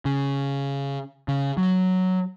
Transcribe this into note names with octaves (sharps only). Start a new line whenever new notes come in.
C#3
C#3
F#3